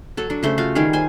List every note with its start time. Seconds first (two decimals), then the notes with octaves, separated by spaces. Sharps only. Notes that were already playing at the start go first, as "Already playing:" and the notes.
0.17 F#3 A4
0.30 F#3 D4
0.43 C#3 A3 C5
0.58 F4 F#4 F5
0.75 D#3 G3 G#4 F5
0.93 C5 G#5